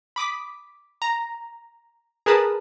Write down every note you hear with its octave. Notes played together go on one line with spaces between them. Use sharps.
B5 D6 D#6 B6
A#5
G#4 A#4 B4 A5 B5 D#6